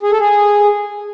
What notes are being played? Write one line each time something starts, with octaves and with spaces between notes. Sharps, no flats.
G#4
A4
G#4